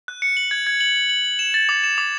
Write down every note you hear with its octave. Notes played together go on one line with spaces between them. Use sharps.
F#6
C#7
F#7
G#6
G#6
F#7
F#7
F#7
F#7
E7
A6
D6
E7
D6